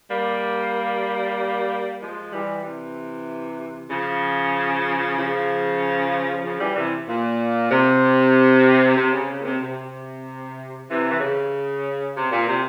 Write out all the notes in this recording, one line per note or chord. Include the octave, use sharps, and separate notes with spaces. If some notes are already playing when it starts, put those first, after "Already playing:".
G3 A#3
F3 G#3
E3 G3
C3 E3
C#3 F3
C#3 F3
C#3 F3
E3 G3
C3 E3
A#2
C3
C3
C#3
C#3
A#2
C3
C3
C3 E3
E3
C#3
C3
A#2
C3